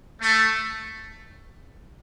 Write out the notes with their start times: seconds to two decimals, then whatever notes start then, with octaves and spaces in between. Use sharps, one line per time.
0.20 A3